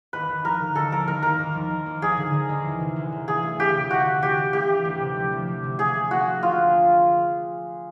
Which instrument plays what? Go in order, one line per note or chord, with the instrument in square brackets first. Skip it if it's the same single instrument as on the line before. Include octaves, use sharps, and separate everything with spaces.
[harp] D#2 [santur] B4
[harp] D#2
[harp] F3 [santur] A#4
[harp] D3
[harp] D#2 [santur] A4
[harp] F3 [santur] A#4
[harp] D#2 [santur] A#4
[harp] D#2 [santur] A#4
[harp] D#2
F3
D#2
D#2
[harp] F3 [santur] G#4
[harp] D3
D3
D#2
E3
C3
D2
D2
[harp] E3 [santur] G#4
[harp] A3
[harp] D2 [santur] G4
[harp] C3
[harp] D2 [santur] F#4
[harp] D2
[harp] D2 [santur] G4
[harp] D2
[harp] A3 [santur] G4
[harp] E3
D2
C3
F3
F3
D2
C3
[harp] D2 [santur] G#4
[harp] A#3
[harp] A#3 [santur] F#4
[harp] F3
[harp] D2 [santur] F4